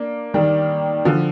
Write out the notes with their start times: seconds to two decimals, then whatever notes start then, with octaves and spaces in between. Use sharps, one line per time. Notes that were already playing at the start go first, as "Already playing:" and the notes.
Already playing: A#3 D4
0.34 D#3 G3
1.05 D3 F3